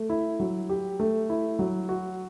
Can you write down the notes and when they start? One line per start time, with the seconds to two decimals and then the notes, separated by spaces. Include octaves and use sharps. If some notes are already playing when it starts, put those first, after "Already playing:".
Already playing: A3
0.10 E4
0.40 F#3
0.69 G4
1.00 A3
1.30 E4
1.59 F#3
1.89 F#4